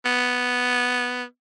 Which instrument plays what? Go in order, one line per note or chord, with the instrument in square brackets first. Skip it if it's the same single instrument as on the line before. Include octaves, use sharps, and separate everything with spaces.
[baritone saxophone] B3